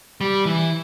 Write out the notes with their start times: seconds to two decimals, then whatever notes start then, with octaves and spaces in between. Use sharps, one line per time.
0.21 G3
0.46 E3